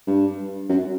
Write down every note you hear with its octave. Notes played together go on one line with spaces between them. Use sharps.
G2
F#2